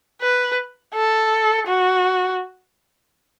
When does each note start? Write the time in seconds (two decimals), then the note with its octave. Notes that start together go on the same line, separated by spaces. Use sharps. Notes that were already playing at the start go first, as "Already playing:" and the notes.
0.21 B4
0.94 A4
1.67 F#4